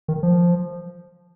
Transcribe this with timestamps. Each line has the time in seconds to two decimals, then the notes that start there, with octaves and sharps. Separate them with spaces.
0.08 D#3
0.23 F3